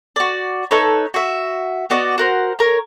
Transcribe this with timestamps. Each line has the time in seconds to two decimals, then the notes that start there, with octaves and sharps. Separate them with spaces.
0.16 F#4 D5
0.71 D#4 A4 B4 C#5
1.14 F#4 E5
1.90 B3 F#4 D5 D#5
2.18 F#4 A#4 C5
2.59 A#4 C#5